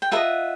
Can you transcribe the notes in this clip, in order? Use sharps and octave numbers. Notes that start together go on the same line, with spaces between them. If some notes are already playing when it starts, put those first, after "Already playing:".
G5
F4 A#4 D#5 E5 F#5